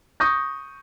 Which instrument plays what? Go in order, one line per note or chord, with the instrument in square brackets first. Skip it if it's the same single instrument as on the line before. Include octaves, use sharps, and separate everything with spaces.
[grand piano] C#6 D#6 G6 A#6